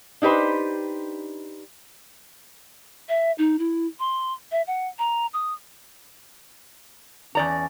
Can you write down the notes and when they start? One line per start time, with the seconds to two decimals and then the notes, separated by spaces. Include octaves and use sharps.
0.22 D4 D#4 G4 B4 C5
3.09 E5
3.38 D#4
3.59 E4
4.00 C6
4.52 E5
4.67 F#5
4.99 A#5
5.33 D#6
7.35 E2 C#4 D5 A#5